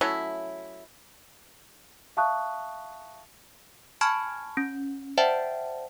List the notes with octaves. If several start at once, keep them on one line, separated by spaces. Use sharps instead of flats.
F#3 A3 C#4 E4
E5 F5 A5 C#6 D#6 F#6
G#5 A5 B5 C#6 F6 G#6
C#4
C5 D5 E5 F#5 G5 A5